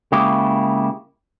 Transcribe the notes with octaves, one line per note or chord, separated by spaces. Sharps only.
C#3 G#3 A#3 E4 G4